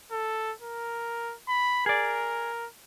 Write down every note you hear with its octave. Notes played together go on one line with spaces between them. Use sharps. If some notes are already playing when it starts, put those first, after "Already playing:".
A4
A#4
B5
G#4 A#4 D5